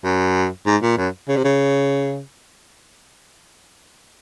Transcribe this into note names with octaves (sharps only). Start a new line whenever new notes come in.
F#2
G#2
A#2
F#2
C#3
C3
C#3